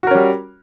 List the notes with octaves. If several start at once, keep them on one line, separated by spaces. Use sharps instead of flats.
G3 C#4 F#4 A#4